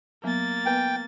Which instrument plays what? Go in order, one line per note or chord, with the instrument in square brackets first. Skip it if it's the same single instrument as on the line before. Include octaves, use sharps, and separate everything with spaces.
[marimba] F#3 B3 [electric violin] A#3 A6
[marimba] B3 B4 G#5 [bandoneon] G5